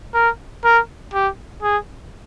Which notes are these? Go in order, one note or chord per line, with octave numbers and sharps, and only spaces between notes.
A#4
A#4
G4
G#4